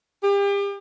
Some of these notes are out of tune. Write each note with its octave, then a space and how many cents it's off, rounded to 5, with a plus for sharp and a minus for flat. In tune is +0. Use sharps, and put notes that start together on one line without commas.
G4 +35